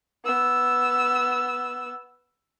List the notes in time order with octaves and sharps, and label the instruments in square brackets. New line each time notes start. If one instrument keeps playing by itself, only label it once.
[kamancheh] B3 E6